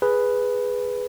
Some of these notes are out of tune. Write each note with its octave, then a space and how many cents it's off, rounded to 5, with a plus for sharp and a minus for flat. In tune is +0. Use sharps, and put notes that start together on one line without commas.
G#4 +0 B4 +0